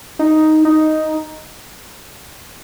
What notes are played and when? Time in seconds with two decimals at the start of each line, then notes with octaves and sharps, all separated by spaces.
0.19 D#4
0.65 D#4